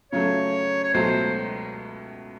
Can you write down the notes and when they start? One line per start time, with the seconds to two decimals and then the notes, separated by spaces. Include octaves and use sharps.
0.12 C#3 F#3 A3 C#5
0.83 C#5
0.94 C#2 B2 F#3 A3 C5